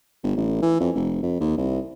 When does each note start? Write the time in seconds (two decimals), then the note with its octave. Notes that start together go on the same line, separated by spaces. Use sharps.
0.24 G1
0.37 A1
0.62 E3
0.80 F2
0.96 F1
1.22 F2
1.40 D#2
1.58 C2